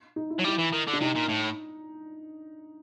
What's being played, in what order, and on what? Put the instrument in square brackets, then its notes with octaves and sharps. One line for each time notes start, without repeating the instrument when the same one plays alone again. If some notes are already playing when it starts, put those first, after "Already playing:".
[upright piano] D#4
E4
[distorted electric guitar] F#3
[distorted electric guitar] G3 [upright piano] E4
[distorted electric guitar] E3
D#3
D3
[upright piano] D4
[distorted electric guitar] C3 [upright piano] D#4
[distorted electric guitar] A#2
A2